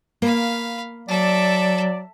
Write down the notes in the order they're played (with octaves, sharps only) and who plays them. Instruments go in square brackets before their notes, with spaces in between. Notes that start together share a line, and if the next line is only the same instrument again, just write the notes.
[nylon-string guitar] A#3 [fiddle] F5 B5
[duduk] F#3 [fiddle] A4 E5 [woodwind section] D5